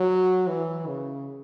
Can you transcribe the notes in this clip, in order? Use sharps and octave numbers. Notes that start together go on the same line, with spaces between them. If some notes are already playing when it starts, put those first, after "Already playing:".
Already playing: F#3
E3
C#3